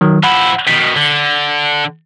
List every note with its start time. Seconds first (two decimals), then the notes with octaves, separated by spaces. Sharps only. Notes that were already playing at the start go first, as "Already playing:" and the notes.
0.01 D#3 F#3
0.23 F3 E4 F#5 B5
0.67 B2 D#3 B6
0.96 D3